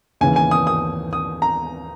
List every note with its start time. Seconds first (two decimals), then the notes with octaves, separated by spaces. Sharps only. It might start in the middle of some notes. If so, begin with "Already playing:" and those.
0.21 D#2 C#3 E3 G#5
0.36 G#5
0.51 D#6
0.67 D#6
1.13 D#6
1.42 A#5